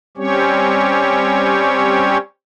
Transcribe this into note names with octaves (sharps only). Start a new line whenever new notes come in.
G3 C4 C#4 G4 C#5